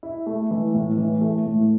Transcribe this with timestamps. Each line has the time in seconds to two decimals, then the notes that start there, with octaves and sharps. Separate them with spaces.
0.03 E4
0.26 A3
0.51 E3
0.74 A2
0.98 E3
1.21 A3
1.46 A2